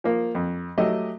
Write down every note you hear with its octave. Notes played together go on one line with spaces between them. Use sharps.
F3 A#3
F2
F#3 A3 G4 D#5